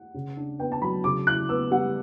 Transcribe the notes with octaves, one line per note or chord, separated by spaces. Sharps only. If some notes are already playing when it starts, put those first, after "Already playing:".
Already playing: F#5
C#3
D4
B3 G5
A5
F#3 B5
C#3 D6
E4 F#6
B3 E6
G3 F#5